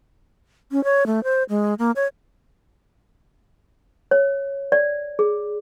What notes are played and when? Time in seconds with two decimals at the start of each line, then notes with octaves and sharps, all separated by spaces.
0.72 C#4
0.84 C#5
1.07 A3
1.24 C5
1.49 G#3
1.79 A#3
1.96 C#5
4.11 C#5
4.72 D5
5.19 G#4